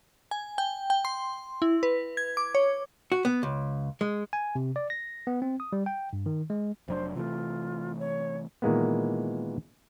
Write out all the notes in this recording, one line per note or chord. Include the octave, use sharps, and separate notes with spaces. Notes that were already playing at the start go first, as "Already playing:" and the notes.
G#5
G5
G5
C6
E4
B4
G#6
D6
C#5
F#4
B3
C#2
G#3
G#5
C3
D5
A#6
B3
C4
D#6
G3
G5
G2
D#3
G#3
F1 F#3 D4 C5
C3 E3 A3 F4
C#5
A#2 D#3 E3 G#3 A#3 B3